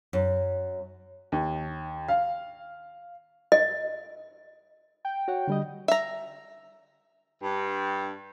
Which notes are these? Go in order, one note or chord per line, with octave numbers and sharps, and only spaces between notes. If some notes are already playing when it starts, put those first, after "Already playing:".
F#2
D#2
F5
D#5
G5
F#4 C#5 F#5
D3 G3 D#5
E5 A#5
G2